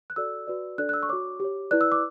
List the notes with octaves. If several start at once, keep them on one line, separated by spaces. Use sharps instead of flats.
F#6
F#4 A4 D5 E6
F#4 B4 D5
D4 A4 D5 F#6
F#6
E6
C#6
F#4 C#5 D6
G4 C#5
E4 B4 D5 F#6
E6
D6